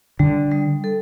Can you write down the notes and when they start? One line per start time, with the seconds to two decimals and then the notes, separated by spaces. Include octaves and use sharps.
0.19 D3 G3
0.51 G3
0.84 A4